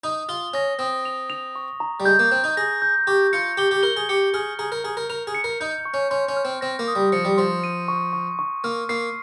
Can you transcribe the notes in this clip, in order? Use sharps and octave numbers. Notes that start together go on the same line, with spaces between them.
D#4 D#6
F4 G7
C#4 A#6
C4 D#6
F7
F7
C#6
A#5
G3
G#3 G6
A#3
C4 G6
D#4
G#4 A#6
G6
G4 C#6
F4 C#7
G4 G7
G4
A#4 G7
G#4
G4 C#7
G#4 F6
G#4 A#5
A#4
G#4 A#5
A#4
A#4 F7
G#4
C#7
A#4
D#4 G6
C#6
C#4
C#4 C6
C#4
F6
C4
C4 A#6
A#3
D#6
G3
F3 C#7
G3
F3 C6
D#7
C#6
C#6
C#6
A#3 F6
A#3 C7